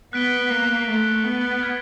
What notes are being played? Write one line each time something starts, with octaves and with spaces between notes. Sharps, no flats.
B3 F#6 B6 D7 G7
A#3
A3
B3
F6 G#6 B6